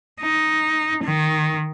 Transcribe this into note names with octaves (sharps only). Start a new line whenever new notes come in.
D#4
D#3